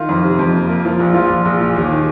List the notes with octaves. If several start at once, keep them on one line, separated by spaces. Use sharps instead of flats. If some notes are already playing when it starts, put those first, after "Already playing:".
Already playing: D#3 F4
F2
C3
F2
A#3
A#3
F3
A#1
F3 F4
A#1
A#1
A#2
D#2
D#3